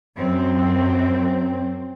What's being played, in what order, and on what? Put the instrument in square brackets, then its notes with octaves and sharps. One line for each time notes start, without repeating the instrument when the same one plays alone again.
[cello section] F#2 C4